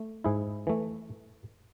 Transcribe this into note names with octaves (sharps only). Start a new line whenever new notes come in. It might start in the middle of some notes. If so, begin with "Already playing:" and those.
Already playing: A3
G#2 E4 G#4
E3 A3